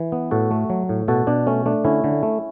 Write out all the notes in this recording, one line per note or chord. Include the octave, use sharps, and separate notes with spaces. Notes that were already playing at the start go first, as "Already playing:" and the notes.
Already playing: E3
B3
A2 F#4 A4
A3
F#3
A2
B2 F#4 A4
B2 D4
A3 C#4
A3 D4
D3 C#4 E4
D3
A3